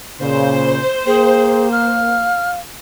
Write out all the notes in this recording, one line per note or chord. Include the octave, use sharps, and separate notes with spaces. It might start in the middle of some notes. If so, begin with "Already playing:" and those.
A#2 C#3 C5
A#3 G#4 G5
F5 F6